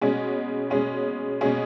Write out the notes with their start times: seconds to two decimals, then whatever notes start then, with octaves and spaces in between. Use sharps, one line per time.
0.01 B2 G#3 C#4 G#4
0.70 B2 G#3 C#4 G#4
1.41 B2 G#3 C#4 G#4